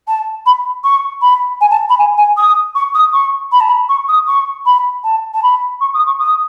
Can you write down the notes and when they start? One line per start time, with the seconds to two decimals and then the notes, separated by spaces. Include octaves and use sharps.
0.07 A5
0.46 B5
0.84 C#6
1.21 B5
1.61 G#5
1.70 A5
1.89 B5
1.98 G#5
2.17 G#5
2.37 D#6
2.75 C#6
2.94 D#6
3.13 C#6
3.52 B5
3.60 A5
3.69 B5
3.89 C#6
4.08 D#6
4.28 C#6
4.65 B5
5.04 A5
5.34 A5
5.42 B5
5.81 C#6
5.94 D#6
6.06 C#6
6.19 D#6